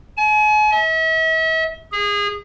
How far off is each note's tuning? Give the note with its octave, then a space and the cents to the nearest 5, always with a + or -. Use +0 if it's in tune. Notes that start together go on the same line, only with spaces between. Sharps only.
G#5 +40
E5 -40
G#4 -25